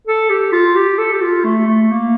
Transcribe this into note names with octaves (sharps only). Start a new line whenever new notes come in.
A4
G4
F4
G4
A4
G4
F4
A3
A3
A#3